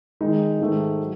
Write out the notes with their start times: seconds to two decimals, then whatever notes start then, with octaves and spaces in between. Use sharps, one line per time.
0.21 D#3 G#3 D#4
0.60 G#2 D#3 A3
1.00 F#3